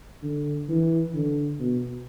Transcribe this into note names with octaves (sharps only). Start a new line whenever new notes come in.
D3
E3
D3
B2